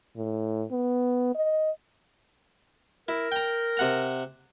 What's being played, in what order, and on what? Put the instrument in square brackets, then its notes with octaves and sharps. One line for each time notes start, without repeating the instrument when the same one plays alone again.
[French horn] A2
B3
D#5
[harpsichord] E4 [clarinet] A#4
[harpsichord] G5 A#5
C3 F#5 A#5